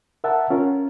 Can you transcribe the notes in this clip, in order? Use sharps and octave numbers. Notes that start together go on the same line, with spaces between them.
A#4 E5 F#5 A5
C#4 F4 A#4